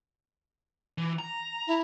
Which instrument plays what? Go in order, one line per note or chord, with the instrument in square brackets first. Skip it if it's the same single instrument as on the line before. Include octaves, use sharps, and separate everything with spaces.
[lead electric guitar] E3
A#5
[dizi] E4